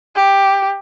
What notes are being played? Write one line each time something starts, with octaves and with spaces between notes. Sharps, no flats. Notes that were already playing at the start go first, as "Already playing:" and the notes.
G4